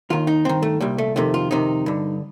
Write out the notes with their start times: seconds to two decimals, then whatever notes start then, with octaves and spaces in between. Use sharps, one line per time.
0.10 D#2 D#3 F4
0.27 D#4
0.45 G2 D#3 C4
0.62 A3
0.81 C2 A#2 G3
0.98 A3
1.16 F2 C3 D#3 A3
1.34 F4
1.51 F2 C3 D#3 D#4
1.86 G2 D3